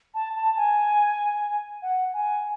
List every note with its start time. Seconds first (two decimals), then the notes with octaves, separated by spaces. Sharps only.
0.15 A5
0.36 A5
0.57 G#5
1.82 F#5
2.14 G#5